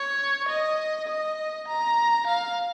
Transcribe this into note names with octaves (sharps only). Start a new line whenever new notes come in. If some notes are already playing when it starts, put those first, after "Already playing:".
Already playing: C#5
D#5
D#5
A#5
F5